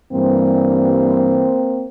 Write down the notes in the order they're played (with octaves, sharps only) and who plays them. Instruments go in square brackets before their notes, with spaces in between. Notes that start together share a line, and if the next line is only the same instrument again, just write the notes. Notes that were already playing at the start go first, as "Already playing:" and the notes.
[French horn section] G2 E3 G3 A#3 C4